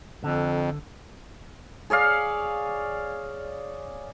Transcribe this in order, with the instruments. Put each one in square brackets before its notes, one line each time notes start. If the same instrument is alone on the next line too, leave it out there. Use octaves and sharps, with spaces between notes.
[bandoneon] F2 [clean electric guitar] D3
[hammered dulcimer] G#4 C#5 D5 F5